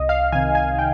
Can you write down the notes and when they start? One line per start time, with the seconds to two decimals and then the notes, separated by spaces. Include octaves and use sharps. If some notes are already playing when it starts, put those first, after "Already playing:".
Already playing: C2 D#5
0.09 F5
0.32 C3 D#3 G#5
0.55 G#5
0.79 G5